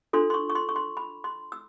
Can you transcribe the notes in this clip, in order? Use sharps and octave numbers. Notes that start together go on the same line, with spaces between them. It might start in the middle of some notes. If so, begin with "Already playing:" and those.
D4 F4 A4 C6
C6
C#6
C#6
C6
C#6
C6
B5
C6
E6